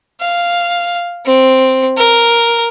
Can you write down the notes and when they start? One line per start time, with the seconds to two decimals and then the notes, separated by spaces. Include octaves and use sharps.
0.21 F5
1.26 C4
1.98 A#4